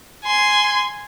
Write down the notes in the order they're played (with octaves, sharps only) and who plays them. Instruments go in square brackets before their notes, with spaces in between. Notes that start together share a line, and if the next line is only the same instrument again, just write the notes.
[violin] G#5 C6